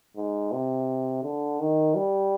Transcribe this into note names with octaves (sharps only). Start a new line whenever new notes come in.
G#2
C3
D3
D#3
G3